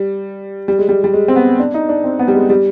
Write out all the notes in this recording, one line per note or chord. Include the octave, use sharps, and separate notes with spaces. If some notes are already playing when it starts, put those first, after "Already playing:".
Already playing: G3
G3
G#3
G3
G3
G#3
C4
B3
D4
D#4
D4
C4
B3
G3
G#3
G3